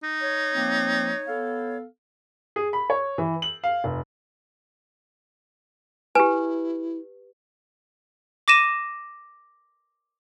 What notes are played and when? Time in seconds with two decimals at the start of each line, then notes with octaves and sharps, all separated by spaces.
0.03 D#4
0.21 C#5
0.53 F3 A#3 C4
1.27 B3 A4 F5
2.56 G#4
2.73 B5
2.90 C#5
3.18 E3
3.42 F#7
3.64 F5
3.84 F1
6.15 E4 G4 B4 G#5
8.48 D6 A#6 D#7 E7